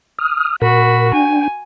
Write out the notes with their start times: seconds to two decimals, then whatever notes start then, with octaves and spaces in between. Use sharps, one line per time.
0.19 D#6 F6
0.62 A#2 F#4 A#4 B5
1.13 D4 G5 G#5